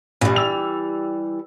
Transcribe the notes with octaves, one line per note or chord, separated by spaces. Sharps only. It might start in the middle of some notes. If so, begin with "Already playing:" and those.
A#1 E3 G3
E6 F7